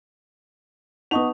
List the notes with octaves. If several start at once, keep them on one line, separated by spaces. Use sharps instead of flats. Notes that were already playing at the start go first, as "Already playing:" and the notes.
B3 D#4 C#5 D#5 F#5 C#6 D#6 F7